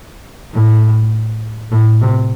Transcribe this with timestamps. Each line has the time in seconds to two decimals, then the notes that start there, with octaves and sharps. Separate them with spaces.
0.53 A2
1.71 A2
2.01 C3